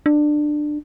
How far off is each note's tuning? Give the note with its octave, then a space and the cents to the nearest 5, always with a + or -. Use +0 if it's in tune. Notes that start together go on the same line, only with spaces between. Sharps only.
D4 +20